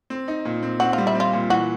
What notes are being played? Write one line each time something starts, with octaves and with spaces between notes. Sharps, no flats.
C4
D#4
A#2
C4
C4 F#4
G3 F4
E4
C4
F4
A#2
E3 F#4